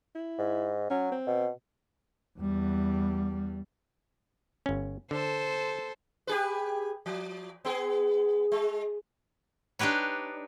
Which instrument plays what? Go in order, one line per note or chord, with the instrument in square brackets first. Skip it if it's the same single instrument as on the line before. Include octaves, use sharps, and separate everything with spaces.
[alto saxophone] E4
[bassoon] G#2
[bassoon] F#3 [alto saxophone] C#4
[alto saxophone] C4
[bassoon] B2
[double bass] E2 G3
[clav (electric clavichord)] G1 C#4
[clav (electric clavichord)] D3 [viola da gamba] A4 C5
[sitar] G4 G#4 B4
F3
B3 G#4
G#3
[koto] D4 D#4 G4 B4 C#5